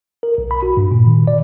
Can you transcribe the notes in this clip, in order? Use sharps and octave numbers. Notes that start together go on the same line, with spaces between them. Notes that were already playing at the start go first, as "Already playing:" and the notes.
A#4
B1
B5
F#4
G2
A#2
D#3
D5